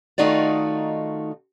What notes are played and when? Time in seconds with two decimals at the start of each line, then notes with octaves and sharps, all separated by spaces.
0.18 D#3 A3 D#4 F4 F#4 D5